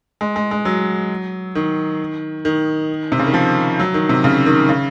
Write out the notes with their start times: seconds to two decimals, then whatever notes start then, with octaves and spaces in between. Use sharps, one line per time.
0.21 G#3
0.36 G#3
0.51 G#3
0.65 F#3
1.55 D#3
2.45 D#3
3.12 C3
3.19 C#3
3.27 D#3
3.34 F3
3.80 F#3
3.94 D#3
4.09 C3
4.24 C#3
4.46 D#3
4.69 C#3